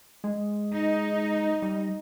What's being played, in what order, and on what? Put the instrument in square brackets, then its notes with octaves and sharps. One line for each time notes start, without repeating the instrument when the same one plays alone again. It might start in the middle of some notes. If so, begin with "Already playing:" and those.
[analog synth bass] G#3
[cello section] D#4
[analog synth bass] G3